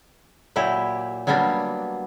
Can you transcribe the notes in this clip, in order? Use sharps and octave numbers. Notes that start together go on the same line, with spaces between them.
A#2 F#3 E4 G4
F#3 G3 A#3 B3 D4